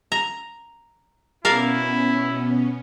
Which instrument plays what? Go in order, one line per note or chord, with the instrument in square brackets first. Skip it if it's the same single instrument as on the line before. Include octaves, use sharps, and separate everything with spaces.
[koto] A#5
[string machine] B2 B3 C#4 [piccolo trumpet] E4 [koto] A#4 D5 F5